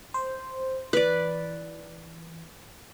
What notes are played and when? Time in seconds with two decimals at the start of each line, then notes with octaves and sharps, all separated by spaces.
0.14 C5
0.93 E3 B4 D5